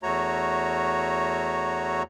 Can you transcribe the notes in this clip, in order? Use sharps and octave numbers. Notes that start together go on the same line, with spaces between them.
E2 A3 F#4 C#5 A#5